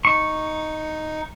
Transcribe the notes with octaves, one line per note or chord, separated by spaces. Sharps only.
D#4 C#6